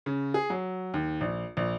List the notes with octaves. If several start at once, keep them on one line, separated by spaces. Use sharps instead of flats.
C#3
G#4
F#3
D#2
A#1
A#1